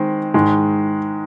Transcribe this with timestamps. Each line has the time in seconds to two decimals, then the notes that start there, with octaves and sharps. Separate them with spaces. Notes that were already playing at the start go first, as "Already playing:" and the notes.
Already playing: D#3 G#3 C4
0.34 G#2 D#3 G#3